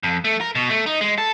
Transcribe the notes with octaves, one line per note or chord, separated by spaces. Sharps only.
F2
A3
A#4
B2
A3
D#4
G#3
A4